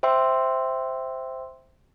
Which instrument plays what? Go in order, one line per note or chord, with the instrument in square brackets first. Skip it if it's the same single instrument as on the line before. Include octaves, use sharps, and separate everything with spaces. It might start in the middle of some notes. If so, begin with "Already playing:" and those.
[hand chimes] C5 E5 G5 C6 E6